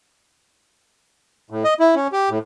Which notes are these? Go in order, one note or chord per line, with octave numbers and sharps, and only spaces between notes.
A2
D#5
E4
C#4
G4
A2